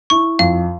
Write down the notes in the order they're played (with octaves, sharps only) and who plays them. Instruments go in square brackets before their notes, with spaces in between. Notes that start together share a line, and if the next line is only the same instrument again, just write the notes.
[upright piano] E4 [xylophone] C#6
[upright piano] F2 [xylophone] F5